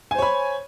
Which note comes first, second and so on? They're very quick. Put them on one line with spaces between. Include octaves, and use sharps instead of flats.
G#5 C5 C#5 B5